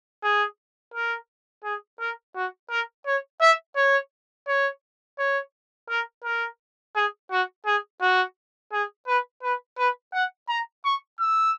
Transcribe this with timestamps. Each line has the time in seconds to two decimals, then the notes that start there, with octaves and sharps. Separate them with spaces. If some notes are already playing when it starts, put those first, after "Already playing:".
0.23 G#4
0.94 A#4
1.64 G#4
2.00 A#4
2.35 F#4
2.70 A#4
3.06 C#5
3.41 E5
3.76 C#5
4.48 C#5
5.18 C#5
5.90 A#4
6.24 A#4
6.95 G#4
7.31 F#4
7.66 G#4
8.01 F#4
8.73 G#4
9.07 B4
9.43 B4
9.78 B4
10.14 F#5
10.49 A#5
10.85 C#6
11.20 E6